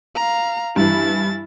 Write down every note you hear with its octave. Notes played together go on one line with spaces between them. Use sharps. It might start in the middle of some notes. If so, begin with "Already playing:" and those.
F5 A#5
G2 E3 E4 A6